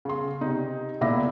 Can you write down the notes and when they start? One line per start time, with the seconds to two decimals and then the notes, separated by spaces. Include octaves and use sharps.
0.05 C#3 C6
0.41 C3 D#4
1.01 E1 A#2 E4 E5 D6 A#6